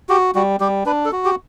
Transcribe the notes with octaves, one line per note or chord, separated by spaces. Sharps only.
F#4 G4
G3 F#4
G3 G4
D4 B4
A4
F#4
G4